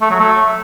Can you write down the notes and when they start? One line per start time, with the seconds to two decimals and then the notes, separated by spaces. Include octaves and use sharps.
0.02 A3
0.11 F#3
0.20 A3